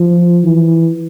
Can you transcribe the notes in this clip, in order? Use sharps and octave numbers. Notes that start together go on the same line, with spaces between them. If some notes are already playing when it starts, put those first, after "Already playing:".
Already playing: F3
E3